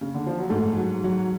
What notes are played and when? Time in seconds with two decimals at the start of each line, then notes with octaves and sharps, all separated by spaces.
0.01 C#3
0.14 D3
0.26 F3
0.39 F#3
0.50 G#2 G#3 A3
0.77 F#3
1.04 F#3